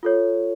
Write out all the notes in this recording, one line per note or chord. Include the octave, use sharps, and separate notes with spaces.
F4 A4 C#5